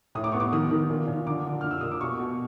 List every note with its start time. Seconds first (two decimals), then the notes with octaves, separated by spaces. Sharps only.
0.15 A2 D#6
0.24 D6
0.32 B3 C#6
0.40 D6
0.52 D#3 D#6
0.71 D#3
0.90 A#2
1.08 A#2
1.26 D3 D6
1.45 D3
1.61 A#2 F6
1.71 E6
1.81 A#2 D#6
1.92 D6
2.01 B2 C#6
2.19 B2